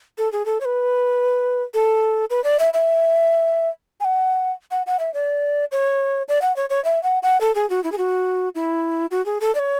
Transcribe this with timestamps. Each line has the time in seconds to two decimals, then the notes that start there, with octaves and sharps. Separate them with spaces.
0.18 A4
0.32 G#4
0.46 A4
0.61 C#5
0.65 B4
1.74 A4
2.30 B4
2.44 D5
2.59 E5
2.73 E5
4.00 G#5
4.04 F#5
4.71 F#5
4.86 F#5
4.99 E5
5.14 D5
5.72 C#5
6.28 D5
6.42 F#5
6.56 C#5
6.70 C#5
6.84 E5
7.03 F#5
7.23 F#5
7.41 A4
7.55 G#4
7.70 F#4
7.84 E4
7.92 G#4
7.98 F#4
8.55 E4
9.11 F#4
9.26 G#4
9.41 A4
9.55 D5
9.59 C#5